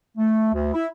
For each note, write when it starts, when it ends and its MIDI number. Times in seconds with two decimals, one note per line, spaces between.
0.17 0.54 57
0.54 0.73 38
0.74 0.87 64